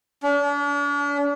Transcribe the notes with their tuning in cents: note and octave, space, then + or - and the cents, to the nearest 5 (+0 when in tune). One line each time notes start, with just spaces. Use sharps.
D4 -40